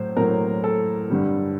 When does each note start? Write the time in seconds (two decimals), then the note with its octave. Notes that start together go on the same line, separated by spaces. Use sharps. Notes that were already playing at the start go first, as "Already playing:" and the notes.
Already playing: A2 F#3 C5
0.17 A2 F#3 A#4
0.64 A4
1.10 G2 D3 G3